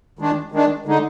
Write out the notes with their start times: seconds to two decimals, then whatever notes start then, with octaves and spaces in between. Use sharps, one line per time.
0.19 D#3 G#3 D4
0.52 D#3 G#3 D4
0.86 D3 G#3 D#4